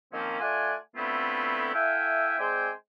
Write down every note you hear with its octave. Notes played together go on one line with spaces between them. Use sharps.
D#3 F3 A#3 C4 C#4
A3 F4 D5 F#5 G#5
D3 A3 B3 C4 E4 F4
E4 A4 E5 F5 G5 G#5
G#3 C4 C5 D5 G5 G#5